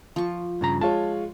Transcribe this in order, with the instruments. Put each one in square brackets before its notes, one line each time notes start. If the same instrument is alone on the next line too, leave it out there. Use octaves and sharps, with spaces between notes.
[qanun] F3 C#6
[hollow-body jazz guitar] G2 C#3 A#5
[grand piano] G#3 F4 C#5 [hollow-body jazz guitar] A5